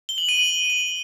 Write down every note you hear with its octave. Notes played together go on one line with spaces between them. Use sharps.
G7
F#7
D#7
F#7
F#7